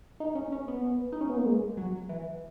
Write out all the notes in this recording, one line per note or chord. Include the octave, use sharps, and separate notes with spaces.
D#4
C#4
C#4
B3
D#4
C#4
B3
A#3
G#3
F#3
E3